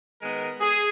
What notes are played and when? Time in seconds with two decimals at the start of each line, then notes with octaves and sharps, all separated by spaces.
0.21 D#3 G#3 B3 A#4
0.61 G#4